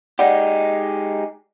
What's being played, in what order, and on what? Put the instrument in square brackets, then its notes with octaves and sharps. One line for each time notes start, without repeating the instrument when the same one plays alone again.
[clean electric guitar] G#3 D#4 G4 [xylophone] D5 F#5